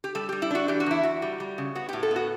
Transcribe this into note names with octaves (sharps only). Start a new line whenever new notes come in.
G4
G3 A4
G3 G4
E4
D4 F#4
E3 G4
F#4
E2 E4
E2 F#4
G3
G3
C#3
B3 F#4
A2 G4
A4
B3
F#4